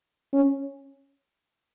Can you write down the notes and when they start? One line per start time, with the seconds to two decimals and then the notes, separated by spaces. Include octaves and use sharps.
0.33 C#4